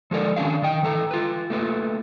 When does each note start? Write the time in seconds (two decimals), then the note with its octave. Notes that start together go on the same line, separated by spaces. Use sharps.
0.11 F3 G#3 A4 A#4 D5
0.36 D#3 C#4 D4 F5
0.62 D#3 D#5 G5
0.83 E3 A4 A#5
1.11 F4 B4
1.50 A3 A#3 F4 B4